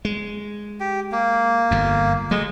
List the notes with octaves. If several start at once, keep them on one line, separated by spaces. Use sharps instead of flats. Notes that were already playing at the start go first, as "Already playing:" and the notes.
G#3
G4
A#3
G1 F2
F#3 G#3 A3